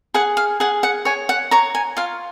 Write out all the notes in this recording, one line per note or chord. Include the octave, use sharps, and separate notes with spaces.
G#4 F#5
F5
G#4 F#5
F#5
C#5 G#5
F#5
C#5 A#5
G#5
F4 F5